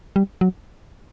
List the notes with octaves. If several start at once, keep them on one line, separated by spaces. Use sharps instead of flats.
G3
F#3